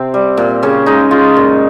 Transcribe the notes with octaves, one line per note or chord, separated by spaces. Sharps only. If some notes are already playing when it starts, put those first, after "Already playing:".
Already playing: C3 C4
G3
A#2
C#3 C#4
G#3 D#4
G#3 F4
A#2